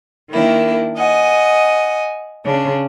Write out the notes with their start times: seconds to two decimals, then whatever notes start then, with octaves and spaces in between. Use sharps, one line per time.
0.29 D#3 A#3 D4 E4
0.97 D#5 F#5 G#5
2.44 C#3 D4